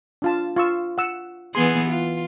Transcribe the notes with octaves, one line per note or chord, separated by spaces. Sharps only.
D4 F4 A5
F4 C#6 E6
F#5 E6
E3 B3 G#4 C6
F4